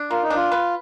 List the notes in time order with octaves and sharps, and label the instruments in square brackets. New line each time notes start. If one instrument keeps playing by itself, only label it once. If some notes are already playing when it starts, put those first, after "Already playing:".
Already playing: [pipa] D4
[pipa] A#3 [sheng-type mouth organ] F4
[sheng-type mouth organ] D#4
[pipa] D4 [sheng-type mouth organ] F4
[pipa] B4